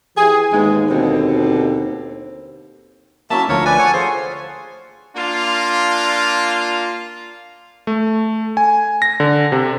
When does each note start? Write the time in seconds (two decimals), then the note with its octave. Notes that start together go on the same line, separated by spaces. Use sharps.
0.17 E3 E4 G4 G#4
0.51 D#2 G#2 G#3 B3
0.90 B2 D3 C4
3.30 F#3 A#3 C#4 E4 E5 A5
3.49 D2 F3 A3 A#4 C#5
3.66 B4 D5 G#5
3.79 A4 C#5 F#5 A5
3.94 F4 G#4 C5
5.16 A#3 D4 F4
7.87 A3
8.57 G#5
9.02 A#6
9.20 D3
9.52 C3